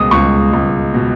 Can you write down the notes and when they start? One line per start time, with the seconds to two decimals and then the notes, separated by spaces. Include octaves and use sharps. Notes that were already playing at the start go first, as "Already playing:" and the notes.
Already playing: C#2 B2 G#3 D#6
0.11 C#2 C#6
0.53 C#2
0.94 B2